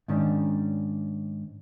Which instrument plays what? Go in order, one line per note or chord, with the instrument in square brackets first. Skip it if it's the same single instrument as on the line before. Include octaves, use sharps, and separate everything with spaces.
[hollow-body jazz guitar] G#2 D#3 C#4 D4